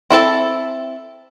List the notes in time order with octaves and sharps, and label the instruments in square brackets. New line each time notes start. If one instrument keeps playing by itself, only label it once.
[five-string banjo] C4 E4 A4 A5